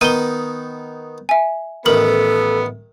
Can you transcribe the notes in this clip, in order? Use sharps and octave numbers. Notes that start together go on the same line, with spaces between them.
D#3 B3 D#4 D#7 G7
E5 G#5
A1 D#3 B3 A4 A#4 F#7